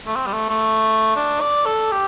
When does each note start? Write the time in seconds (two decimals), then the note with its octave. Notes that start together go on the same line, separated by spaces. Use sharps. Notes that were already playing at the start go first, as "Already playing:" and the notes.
0.06 A3
0.16 C4
0.26 G3
0.33 A3
0.49 A3
1.16 D4
1.41 D5
1.66 A4
1.92 G4